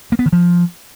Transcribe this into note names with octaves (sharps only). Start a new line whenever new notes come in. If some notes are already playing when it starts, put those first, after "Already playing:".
A#3
B3
D#3
F3